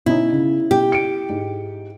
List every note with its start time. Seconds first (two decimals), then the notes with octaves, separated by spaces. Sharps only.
0.06 B2 C#4 D#4 E4
0.32 C#3
0.71 B2 G4
0.92 C#7 D7
1.30 G#2